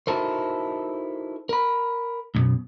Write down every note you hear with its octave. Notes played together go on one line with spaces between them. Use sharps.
D#4 E4 F#4 A4 A#4 C5
A#4 B5
C#2 F#2 B2